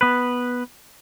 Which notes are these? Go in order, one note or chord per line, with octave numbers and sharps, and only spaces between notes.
B3 B4